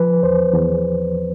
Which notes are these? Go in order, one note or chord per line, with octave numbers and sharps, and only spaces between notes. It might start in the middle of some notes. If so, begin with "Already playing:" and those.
Already playing: F3 B4
E2 C5
E2